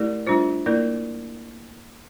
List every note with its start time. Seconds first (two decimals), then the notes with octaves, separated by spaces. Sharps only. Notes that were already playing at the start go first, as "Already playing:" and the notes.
Already playing: A3 E4 G4 A#4 D5
0.26 G3 D4 F4 C5
0.66 A#3 E4 A#4 D5